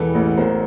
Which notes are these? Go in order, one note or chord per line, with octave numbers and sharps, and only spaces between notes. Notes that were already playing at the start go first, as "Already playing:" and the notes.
Already playing: E1 E3 A4 B4
A1
B1 A#4 C5